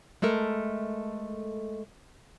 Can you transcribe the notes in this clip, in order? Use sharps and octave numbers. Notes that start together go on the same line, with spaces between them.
G#3 A3 A4 A#4